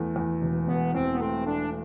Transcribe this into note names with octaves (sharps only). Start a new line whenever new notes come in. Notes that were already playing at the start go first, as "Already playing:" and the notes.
Already playing: E2 A3
E2
E1
E1 B3
E2 C4
B3
A3 C4
A3 D4